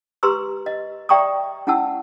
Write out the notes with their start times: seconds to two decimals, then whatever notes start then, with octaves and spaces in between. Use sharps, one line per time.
0.23 G4 B4 A#5 C6 E6
0.66 D#5
1.09 D5 E5 G5 A#5 C#6 D#6
1.67 C#4 E4 F#5 A5 E6